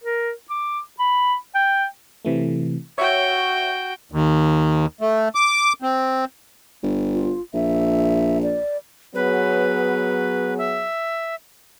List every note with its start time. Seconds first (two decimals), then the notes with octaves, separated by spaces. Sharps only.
0.04 A#4
0.50 D6
0.99 B5
1.55 G5
2.25 C3 E3 A3
2.98 F#4 C#5 E5 G5 C#6
4.12 D#2
5.01 A3
5.35 D6
5.82 C4
6.83 G1
7.14 F4
7.54 A#1 E5
8.43 D5
9.15 F#3 B3 G#4 B4
10.58 E5